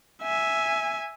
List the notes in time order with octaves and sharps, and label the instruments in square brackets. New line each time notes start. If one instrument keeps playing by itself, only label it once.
[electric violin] E5 G#5